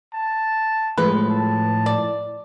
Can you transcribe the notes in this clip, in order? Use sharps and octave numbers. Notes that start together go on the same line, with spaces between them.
A5
A2 F3 G#3 F4 B4
A5
D5